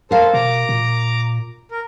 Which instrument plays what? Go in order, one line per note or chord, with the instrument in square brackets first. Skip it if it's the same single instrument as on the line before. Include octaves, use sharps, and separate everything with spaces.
[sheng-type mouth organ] A4 C5 [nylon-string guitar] A#4 F5
[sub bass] B2 [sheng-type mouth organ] A#5 D6
[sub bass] A#2
[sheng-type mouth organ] A#4